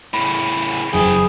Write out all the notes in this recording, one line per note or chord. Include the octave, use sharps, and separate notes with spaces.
A2 C#3 B5
F#1 E3 G#4 G5